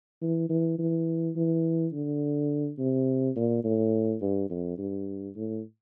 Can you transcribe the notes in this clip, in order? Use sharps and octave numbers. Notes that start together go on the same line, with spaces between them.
E3
E3
E3
E3
D3
C3
A#2
A2
G2
F2
G2
A2